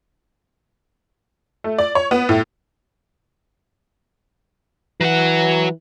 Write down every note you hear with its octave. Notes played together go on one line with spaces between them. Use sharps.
A3
D5
C#5
B3
A2
E3 F#3 F#5